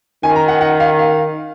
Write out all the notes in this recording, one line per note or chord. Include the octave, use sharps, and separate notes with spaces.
D#3 G#5
A#5
F#5
F#5
F5
F5